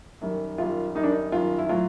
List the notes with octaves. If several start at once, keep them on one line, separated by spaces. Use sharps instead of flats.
F#2 D#3 G3
F#2 D#3 G3 F4
F#2 D#3 G3 D#4
D4
D#4
F#2 D#3 G3 F4
E4
A2 F#3 F4